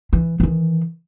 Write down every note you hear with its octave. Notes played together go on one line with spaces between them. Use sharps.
E3
D#3 E3